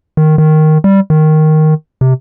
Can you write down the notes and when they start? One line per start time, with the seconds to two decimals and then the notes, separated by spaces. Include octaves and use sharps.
0.17 D#3
0.38 D#3
0.84 G3
1.10 D#3
2.01 C3